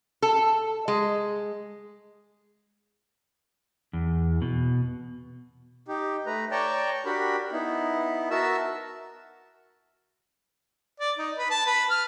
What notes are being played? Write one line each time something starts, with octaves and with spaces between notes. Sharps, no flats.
A4
G#3
E2
B2
D#4 G4
A3 B4 A#5
C#5 D5 G5 A5 A#5
D4 F#4 G4 A#4 B5
B3 D#4 E4
F#4 A#4 E5 A5 E6
D5
D#4
B4
A5
B4
F6